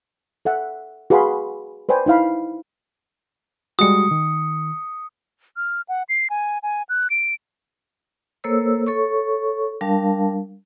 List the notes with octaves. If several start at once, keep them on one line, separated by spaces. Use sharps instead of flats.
A4 E5 F#5
F#4 G#4 B4 F5 B5 C6
B4 C5 D5 G5 G#5
D#4 E4 F5 B5
G3 G#3 F#4 D#6 C#7
D#3
F6
F#5
C7
G#5
G#5
F#6
D7
A#3 A4 A#4 C5 C#5 E6
A4 C#5 C#6
G3 D4 A#4 F5 A5